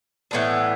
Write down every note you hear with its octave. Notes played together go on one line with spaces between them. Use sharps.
A2 E3 B3 D4